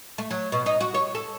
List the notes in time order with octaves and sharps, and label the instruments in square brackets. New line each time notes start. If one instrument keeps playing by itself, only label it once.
[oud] A3
F#3
B2
D#4
F#4
C#5
A4